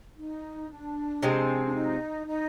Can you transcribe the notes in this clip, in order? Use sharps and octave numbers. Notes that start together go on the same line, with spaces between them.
D#4
D4
C3 F3 G#3 C4
D4
D#4
D#4